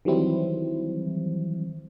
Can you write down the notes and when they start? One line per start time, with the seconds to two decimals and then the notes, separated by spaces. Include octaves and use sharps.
0.05 D#3 E3 F#3 G3 C4 E4